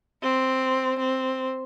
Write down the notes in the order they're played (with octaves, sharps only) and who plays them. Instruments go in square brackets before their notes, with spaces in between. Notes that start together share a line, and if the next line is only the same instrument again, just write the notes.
[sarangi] C4
C4